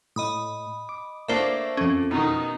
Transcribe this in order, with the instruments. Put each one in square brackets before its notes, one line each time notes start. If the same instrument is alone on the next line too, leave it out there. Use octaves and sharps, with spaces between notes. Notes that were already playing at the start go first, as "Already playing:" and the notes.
[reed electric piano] A2 [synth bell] D#5 B5 D#6
[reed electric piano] D6
[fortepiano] A3 A#3 D4 [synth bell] C5 E5
[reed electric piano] F2 A4 [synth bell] C#4
[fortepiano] B2 D#3 [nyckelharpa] D#4